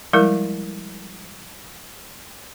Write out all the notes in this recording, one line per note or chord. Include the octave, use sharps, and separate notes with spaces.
F3 G3 G#3 E4 A#4